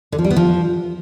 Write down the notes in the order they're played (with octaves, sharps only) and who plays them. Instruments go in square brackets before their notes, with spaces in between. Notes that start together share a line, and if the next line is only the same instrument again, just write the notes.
[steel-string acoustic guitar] D3
F3
G3
B3
F3